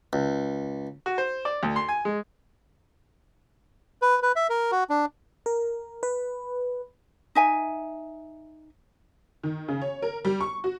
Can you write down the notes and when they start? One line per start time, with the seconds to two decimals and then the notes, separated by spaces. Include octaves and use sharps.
0.13 C#2
1.06 F#4
1.18 C5
1.45 D5
1.63 D2
1.76 C6
1.89 G#5
2.05 G#3
4.02 B4
4.22 B4
4.36 E5
4.50 A#4
4.72 F#4
4.90 D4
5.46 A#4
6.03 B4
7.35 D#4 E5 G#5
9.43 D#3
9.68 C#3
9.81 C#5
10.02 A#4
10.25 G3
10.40 C#6
10.64 F#4